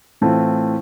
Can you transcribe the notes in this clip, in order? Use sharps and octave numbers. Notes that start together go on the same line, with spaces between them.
A2 E3 A3 C4 F4